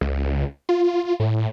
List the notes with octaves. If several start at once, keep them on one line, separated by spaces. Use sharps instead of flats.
C#2
F4
A2